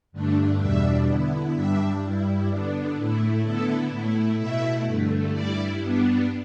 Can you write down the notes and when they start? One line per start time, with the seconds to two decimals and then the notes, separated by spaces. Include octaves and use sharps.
0.12 G2 D3 A3 D4
0.59 E2 B2 G3 D4 E5
1.07 D3 B3 E4
1.54 G2 G3 D4 E5
2.01 G2 G3 E4
2.48 D3 B3 D4
2.96 A2 A3 E4
3.42 D3 B3 E4 A4
3.90 A2 A3 E4
4.37 B2 A3 E4 E5
4.85 G2 D3 A3
5.32 G2 G3 E4 D5
5.79 G2 G3 B3 D4